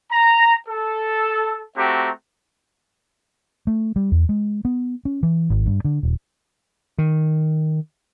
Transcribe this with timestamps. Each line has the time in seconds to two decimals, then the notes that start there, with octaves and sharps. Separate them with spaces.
0.10 A#5
0.68 A4
1.76 A3 C4 F#4 G4 A#5
3.67 A3
3.96 G3
4.12 E2
4.29 G#3
4.65 B3
5.05 C#4
5.23 E3
5.50 G#1
5.66 G2
5.85 D3
6.03 D#1
6.98 D#3